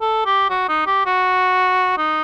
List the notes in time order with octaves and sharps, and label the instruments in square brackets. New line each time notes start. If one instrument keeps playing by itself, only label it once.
[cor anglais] A4
G4
F#4
D#4
G4
F#4
D#4